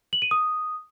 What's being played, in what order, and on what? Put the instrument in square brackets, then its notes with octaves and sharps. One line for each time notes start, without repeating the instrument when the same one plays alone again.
[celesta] F#7
D#7
D#6